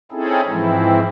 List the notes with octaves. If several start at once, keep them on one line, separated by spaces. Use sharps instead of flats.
C4 C#4 D#4 E4 G#4 A4
G#2 E3 F3 G#3 C4 E4